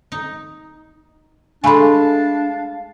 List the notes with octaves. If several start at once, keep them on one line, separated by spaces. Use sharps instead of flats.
D#4
G#3 A3 D4 F5 G#5 B5